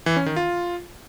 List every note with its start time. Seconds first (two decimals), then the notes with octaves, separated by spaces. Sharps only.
0.06 E3
0.16 C#4
0.26 D#3
0.36 F4